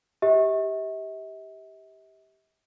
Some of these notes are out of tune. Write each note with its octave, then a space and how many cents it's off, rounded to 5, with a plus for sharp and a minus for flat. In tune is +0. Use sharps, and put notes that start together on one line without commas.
G4 +0 E5 -45